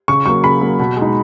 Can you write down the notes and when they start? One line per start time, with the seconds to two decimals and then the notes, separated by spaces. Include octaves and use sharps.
0.08 C#3 C#6
0.26 F#3 A#3 C#6
0.43 C#3 B5
0.61 F#3 A#3
0.79 B2
0.97 G#3 D#4